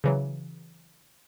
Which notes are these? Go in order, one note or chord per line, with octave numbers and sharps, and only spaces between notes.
C#3 E3 F#3